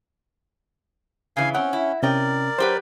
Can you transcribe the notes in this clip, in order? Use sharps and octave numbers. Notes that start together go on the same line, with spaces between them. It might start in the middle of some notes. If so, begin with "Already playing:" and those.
C#3 E3 F5 G#5
C4 C#4 F#5
E4
C3 C#4 A#4 D5 D#5 G5
F#3 G4 B4 C5